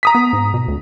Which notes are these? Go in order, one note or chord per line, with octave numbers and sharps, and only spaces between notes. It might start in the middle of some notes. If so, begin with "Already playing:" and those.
A#5 D#6 B6
B3
G#2
B2
D2